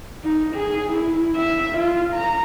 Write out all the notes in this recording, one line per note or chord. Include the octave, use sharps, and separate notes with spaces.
D#4
G#4
E4
E5
F4
A#5